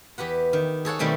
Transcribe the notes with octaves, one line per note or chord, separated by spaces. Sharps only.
E2 G4 B4 F#5
D#3
G#4 A4 C#5 F#5
B2 D#3 G3 A3 C4